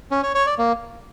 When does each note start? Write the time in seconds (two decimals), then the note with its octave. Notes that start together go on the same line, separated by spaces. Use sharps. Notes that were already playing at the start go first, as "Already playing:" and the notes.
0.11 C#4
0.23 C#5
0.35 C#5
0.47 D5
0.58 A#3